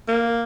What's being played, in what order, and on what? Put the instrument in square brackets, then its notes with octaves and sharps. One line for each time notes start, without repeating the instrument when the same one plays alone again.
[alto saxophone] A#3